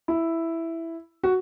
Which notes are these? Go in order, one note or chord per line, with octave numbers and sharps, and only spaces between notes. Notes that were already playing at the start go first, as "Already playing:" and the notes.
E4
F#4